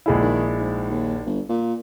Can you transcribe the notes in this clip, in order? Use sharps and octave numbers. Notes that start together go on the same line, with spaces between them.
A#1 G#3 E4
D#3
G#2
D#2
G1
A#2